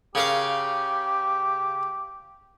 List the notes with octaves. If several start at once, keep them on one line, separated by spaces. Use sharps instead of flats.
C#3 G4 A#4 F5